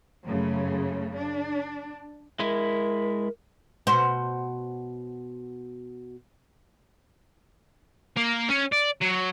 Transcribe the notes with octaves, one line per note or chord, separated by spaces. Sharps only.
F#2 C#3 A3
D4
G#3 E4 A#4
B2 F#4 C5
A#3
C#4
D5
F#3